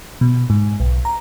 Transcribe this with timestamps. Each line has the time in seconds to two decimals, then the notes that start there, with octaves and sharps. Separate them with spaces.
0.21 B2
0.50 G#2
0.80 B1
1.05 A#5